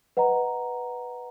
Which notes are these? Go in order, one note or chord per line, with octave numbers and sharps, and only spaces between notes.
B4 D#5 F#5 A#5